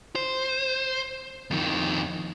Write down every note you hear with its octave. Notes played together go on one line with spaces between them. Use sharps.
C5
F2 D#3